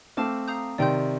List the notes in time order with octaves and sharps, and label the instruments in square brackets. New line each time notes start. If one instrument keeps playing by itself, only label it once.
[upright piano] A3 C4 [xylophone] F5 A5 D6 F6
[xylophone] F5 A#5 D#6 G6
[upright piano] C3 D#3 [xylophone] D5 G5 C6 G6